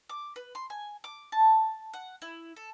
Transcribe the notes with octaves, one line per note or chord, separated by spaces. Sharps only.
D6
B4
C6
G#5
D6
A5
F#5
E4
A4